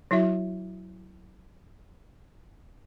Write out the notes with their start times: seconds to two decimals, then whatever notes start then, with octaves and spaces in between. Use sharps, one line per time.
0.11 F#3 E4 F#4 E5